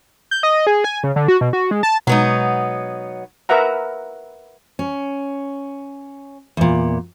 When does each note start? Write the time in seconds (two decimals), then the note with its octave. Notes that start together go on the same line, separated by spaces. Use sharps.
0.31 G6
0.43 D#5
0.67 G#4
0.84 G#5
1.04 C#3
1.16 D3
1.28 F#4
1.41 B2
1.53 F#4
1.71 G#3
1.83 A5
2.07 B2 F#3 G#3 B3 D#4
3.49 A#4 B4 E5 F#5 A#5
4.79 C#4
6.57 E2 A#2